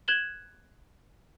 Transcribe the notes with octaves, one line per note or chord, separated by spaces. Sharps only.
F#6 G#6 E7 F#7 G7